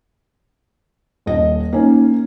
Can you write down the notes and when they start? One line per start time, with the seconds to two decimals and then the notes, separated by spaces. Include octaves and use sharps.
1.26 D#1 D#5
1.73 A#3 C#4 D#4